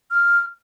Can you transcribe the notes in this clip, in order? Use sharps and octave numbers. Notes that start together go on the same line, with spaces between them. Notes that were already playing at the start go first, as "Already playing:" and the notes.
F6